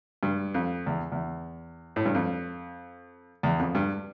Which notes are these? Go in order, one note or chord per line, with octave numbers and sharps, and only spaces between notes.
G2
F2
E2
E2
A2
G2
F2
E2
F2
G2